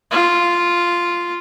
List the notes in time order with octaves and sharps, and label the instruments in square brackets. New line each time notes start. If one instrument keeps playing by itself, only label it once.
[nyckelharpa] F4